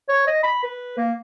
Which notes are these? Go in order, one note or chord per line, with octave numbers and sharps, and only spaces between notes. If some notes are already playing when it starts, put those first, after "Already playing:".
C#5
D#5
B5
B4
A#3